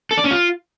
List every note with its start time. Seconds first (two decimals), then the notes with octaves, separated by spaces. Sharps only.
0.11 A4
0.17 D5
0.24 C#4
0.31 F4